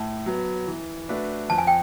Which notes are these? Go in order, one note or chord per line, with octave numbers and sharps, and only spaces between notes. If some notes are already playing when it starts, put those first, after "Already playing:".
Already playing: A2 A5
F#3 B3
E3
A3 D4 F#4 B4
F2 A5
G#5
G5